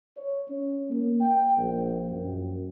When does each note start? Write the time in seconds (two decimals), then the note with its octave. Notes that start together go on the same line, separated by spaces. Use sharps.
0.17 C#5
0.47 C#4
0.90 A#3
1.21 G5
1.57 A#1
2.10 F#2